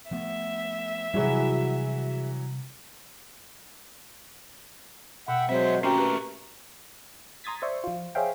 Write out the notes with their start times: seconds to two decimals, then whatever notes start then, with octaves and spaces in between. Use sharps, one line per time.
0.11 F3 A3 B3 E5
1.14 C3 E3 F#3 G3 E4 F#4 G#4
5.28 B2 E5 F#5 G5
5.49 F3 F#3 G#3 C4 C5 E5
5.83 A3 A#3 C#4 F#4 G4 A#4 G5
5.98 G4 B4
7.44 A#5 C6 D#6 G#6 A6 B6
7.62 C5 D5 E5 C6 C#6
7.84 F3 F4
8.15 G#4 C5 C#5 E5 F5 G5